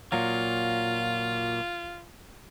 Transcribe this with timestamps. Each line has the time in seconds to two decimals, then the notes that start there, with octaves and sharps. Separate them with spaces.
0.12 A#2 F#3 F4